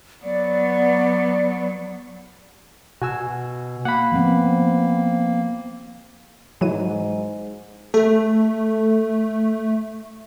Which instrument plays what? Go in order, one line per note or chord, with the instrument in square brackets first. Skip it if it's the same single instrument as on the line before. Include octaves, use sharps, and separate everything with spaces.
[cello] F#3 B3 [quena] D5
[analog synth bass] B2 [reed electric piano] F#4 G#5 E6
[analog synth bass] A#3 [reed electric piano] F#5 B5
[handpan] F3 B3 C4
[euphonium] G#2 [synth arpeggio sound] E3 F#3 D#7
[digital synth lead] A3 [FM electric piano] A4